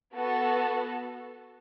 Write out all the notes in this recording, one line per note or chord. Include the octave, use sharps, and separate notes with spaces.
B3 F#4 A4